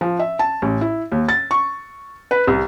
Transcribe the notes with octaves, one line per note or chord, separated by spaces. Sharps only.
F3
E5
A5
A1
E4
D#2
A6
C#6
B4
C2